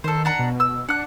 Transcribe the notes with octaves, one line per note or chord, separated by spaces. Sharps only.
D#3 A4 C5
D4 F#5 A#5
B2
E6
D4 F#5 F#6